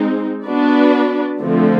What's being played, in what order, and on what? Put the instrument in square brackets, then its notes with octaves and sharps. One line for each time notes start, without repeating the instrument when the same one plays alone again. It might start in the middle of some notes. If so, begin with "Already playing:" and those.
Already playing: [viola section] G#3 C4 D#4
B3 D4 F#4 B4 D5
D3 F3 A3 C4